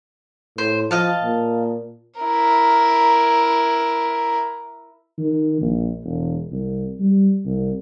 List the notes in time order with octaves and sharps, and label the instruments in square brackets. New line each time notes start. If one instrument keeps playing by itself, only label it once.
[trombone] A2 [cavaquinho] C5
[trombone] F3 [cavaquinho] D#5 F5 A5
[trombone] A#2
[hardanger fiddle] E4 A#4
[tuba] D#3
A#1
E1
C2
G3
C2